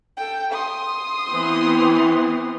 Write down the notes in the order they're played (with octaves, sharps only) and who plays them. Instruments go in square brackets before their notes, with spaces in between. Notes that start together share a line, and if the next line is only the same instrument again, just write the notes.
[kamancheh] A4 G5
C6 D#6
[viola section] E3 B3 C4